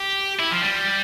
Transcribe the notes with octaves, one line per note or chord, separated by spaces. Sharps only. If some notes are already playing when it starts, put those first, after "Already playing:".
Already playing: G4
E4
F3
G3